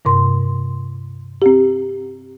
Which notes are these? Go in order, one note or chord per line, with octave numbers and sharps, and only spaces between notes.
G2 C3 C6
C4 G4